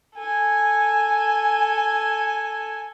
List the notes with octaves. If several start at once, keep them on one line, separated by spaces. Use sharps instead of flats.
A4 G#5